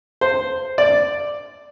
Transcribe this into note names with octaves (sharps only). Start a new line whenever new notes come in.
C5
D5